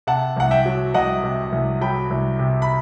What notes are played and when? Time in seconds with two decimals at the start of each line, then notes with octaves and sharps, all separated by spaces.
0.07 C3 F#5 A5
0.36 C2 F#5
0.51 E5 G5
0.66 F#3
0.94 C2 D#5 F#5
1.23 C3
1.52 C2
1.81 F#3 G5 B5
2.10 C2
2.39 C3
2.62 B5